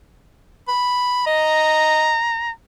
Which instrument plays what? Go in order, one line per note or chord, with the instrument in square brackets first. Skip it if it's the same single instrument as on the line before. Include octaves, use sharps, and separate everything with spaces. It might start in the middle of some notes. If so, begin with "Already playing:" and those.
[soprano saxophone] B5
[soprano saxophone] D#5 [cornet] A#5